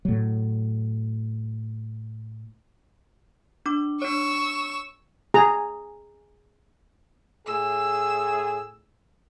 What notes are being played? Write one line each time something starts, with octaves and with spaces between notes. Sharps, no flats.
A2 F#3
D4 D6
D4 C#5 C#6 E6
G#4 A#5
A2 G#4 E6